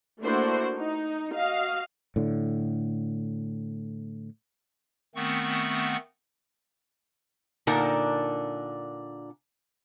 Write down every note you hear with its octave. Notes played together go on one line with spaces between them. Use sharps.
A3 A#3 D4 E4 F#4 C5
D#4
F#4 D#5 F5
A2 D3
D#3 A3 B3 C4 F#5 C#6
A#2 D3 D4 D#4 A#4